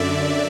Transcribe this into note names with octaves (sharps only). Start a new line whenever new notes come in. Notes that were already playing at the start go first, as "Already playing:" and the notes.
Already playing: F#2 D3 D5 E5